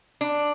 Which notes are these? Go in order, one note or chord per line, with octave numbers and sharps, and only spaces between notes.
D4